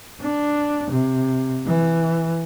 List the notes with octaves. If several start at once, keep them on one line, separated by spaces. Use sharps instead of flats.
D4
C3
E3